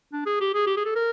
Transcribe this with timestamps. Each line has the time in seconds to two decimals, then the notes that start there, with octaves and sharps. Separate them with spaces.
0.13 D4
0.26 G#4
0.40 G4
0.54 G#4
0.67 G4
0.77 G#4
0.85 A4
0.95 A#4